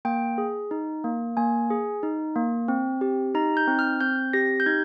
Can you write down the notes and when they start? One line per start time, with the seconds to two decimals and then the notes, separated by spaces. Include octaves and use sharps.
0.05 A#3 G5
0.38 G#4
0.71 D#4
1.04 A#3
1.37 A#3 G#5
1.70 G#4
2.03 D#4
2.36 A#3
2.68 C4
3.01 G4
3.35 D#4 A#5
3.57 G6
3.68 C4
3.79 F6
4.01 C4 G6
4.33 G4 A#6
4.60 G6
4.66 D#4 G#6